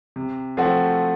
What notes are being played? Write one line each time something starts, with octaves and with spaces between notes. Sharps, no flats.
C3
F3 A3 C4 F#4